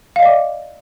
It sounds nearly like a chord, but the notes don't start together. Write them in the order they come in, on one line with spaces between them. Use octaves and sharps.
F5 D#5 D5 D6